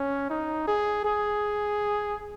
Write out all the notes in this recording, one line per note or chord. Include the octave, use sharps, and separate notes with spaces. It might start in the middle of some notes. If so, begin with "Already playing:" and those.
Already playing: C#4
D#4
G#4
G#4